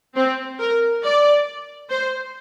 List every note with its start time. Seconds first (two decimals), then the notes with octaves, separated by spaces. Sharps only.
0.16 C4
0.59 A#4
1.03 D5
1.90 C5